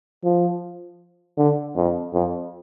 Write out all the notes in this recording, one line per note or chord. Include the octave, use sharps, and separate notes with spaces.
F3
D3
F2
F2